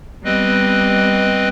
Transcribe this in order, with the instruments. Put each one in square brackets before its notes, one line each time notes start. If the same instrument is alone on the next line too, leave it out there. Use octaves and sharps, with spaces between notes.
[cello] G3 B3 [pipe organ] C4 B4 D#5